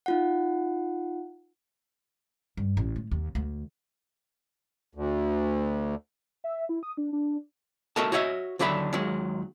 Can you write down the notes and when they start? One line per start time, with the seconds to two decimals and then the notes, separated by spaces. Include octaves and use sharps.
0.06 D#4 F4 F#5
2.57 G2
2.77 A1
2.96 A2
3.11 D#2
3.35 D2
4.95 D2
6.44 E5
6.69 E4
6.83 D#6
6.97 D4
7.13 D4
7.96 A3 F#4 A4 A#4 D#5 A5
8.12 F#4 C#5 D#5 E5
8.59 D#2 D3 F#3 D4 E5 B5
8.93 D#2 D#3 F#3 G#3